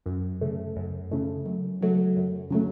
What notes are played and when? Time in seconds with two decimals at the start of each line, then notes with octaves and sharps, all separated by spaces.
0.06 F#2
0.41 C#3 A3
0.76 F#2
1.11 C#3 A3
1.46 F#2
1.81 C#3 F#3 A3
2.16 F#2
2.51 C#3 F#3 A3